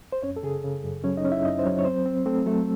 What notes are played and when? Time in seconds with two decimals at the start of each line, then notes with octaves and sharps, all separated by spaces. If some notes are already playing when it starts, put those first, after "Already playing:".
0.12 C5
0.23 F#2 C#4 C#5
0.36 A4
0.43 C#3 G#4
0.64 C#3
0.84 F#2
1.04 F#3 C#4 C#5
1.17 D#4 D#5
1.25 C#4
1.31 E4 E5
1.45 F#2 D#4 D#5
1.59 C5
1.66 F#3 C#4 C#5
1.79 C#5
1.85 C4 C5
2.06 C4
2.26 A3 C4 A4
2.46 F#3 A3 A4